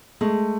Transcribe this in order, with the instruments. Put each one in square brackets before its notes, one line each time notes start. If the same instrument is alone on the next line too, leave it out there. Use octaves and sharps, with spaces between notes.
[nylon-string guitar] G#3 [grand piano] A3